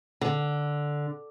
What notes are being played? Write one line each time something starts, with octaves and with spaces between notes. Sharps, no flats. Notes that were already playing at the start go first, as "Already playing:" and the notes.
D3